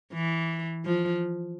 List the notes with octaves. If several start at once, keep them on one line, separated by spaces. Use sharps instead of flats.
E3
F3